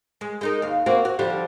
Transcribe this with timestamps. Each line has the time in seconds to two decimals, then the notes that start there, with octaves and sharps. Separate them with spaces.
0.21 G#3
0.41 G#3 D#4 A#4
0.62 D#2 F5
0.86 A#3 C4 F#4
1.05 F#4
1.19 D3 F3 G3